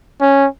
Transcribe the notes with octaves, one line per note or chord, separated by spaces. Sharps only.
C#4